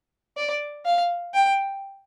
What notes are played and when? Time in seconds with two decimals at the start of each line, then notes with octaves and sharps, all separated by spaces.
0.37 D5
0.85 F5
1.34 G5